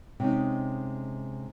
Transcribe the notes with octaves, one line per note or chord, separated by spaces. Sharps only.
C3 G#3 C#4 D#4